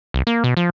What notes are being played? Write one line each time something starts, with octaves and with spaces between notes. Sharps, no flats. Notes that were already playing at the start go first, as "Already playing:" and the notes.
C2
A#3
B2
F3